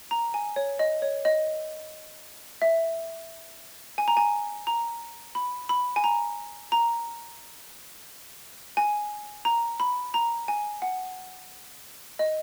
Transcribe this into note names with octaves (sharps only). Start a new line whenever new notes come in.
A#5
G#5
C#5
D#5
C#5
D#5
E5
G#5
A#5
G#5
A#5
B5
B5
G#5
A#5
A#5
G#5
A#5
B5
A#5
G#5
F#5
D#5